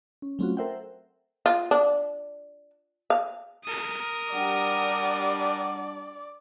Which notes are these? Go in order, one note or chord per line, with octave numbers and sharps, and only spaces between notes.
C#4
F#3 A3 C4 C#4 F4 F#4
A4 A#4 C5 E5 F#5 G5
F4
D4
F5
A#4 D#6
G3 D4 D5 F#5